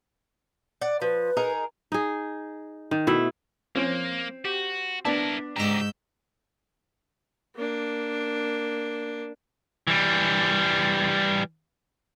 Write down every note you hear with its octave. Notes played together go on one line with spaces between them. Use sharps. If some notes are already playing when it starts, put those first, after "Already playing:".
D5 F#5
F3 B4
D#4 G#4 A#4
D#4 G#4
D#3
B2 A3 E4
F3 A#3 C4 C#4
F#4 G4
B3 D4 E4 A#4 A5
C#2 G#2 G4 A#5 E6 G6 A#6
A#3 D4
E3 G3